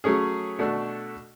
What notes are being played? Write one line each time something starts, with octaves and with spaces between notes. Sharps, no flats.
F#3 A3 C#4 G#4
B2 A3 D4 F#4 A4